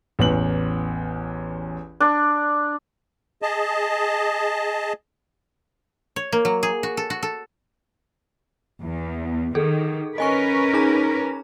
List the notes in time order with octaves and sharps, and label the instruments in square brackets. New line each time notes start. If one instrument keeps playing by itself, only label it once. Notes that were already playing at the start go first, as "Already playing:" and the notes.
[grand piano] A1 E2 F#7
[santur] D4
[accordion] G#4 D#5 A5
[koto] C#5
A#3
F#3
G#4
F#4
A4
F#4
A4
[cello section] E2
[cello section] D#3 [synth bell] G#4 A4
[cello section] C#4 A#4 B4 [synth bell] D#5 G#5 C#6
[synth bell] D#4 G#4 A#5